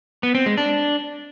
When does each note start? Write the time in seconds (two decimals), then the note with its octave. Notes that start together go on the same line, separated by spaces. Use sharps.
0.23 B3
0.35 C4
0.46 G#3
0.58 D4